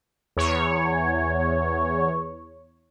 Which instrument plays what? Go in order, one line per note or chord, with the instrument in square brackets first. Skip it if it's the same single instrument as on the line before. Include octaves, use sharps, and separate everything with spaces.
[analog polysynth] E2 C#5